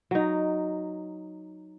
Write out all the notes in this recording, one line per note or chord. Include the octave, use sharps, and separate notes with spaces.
F#3 D#4